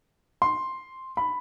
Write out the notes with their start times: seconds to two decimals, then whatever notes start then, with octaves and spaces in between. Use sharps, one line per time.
0.42 C6
1.17 B5